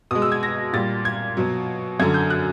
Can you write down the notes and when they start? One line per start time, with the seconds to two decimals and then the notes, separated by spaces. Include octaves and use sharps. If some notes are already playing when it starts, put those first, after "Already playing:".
0.11 B2 G#3 D#6
0.22 E6
0.32 G#6
0.43 A#6
0.73 A#2 G3 A6
1.05 G#6
1.37 B2 F#3
2.00 F#2 D3 F#3 G#6
2.14 G6
2.30 F#6